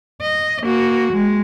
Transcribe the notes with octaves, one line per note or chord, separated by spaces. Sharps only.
D#5
A#3 F#4
G#3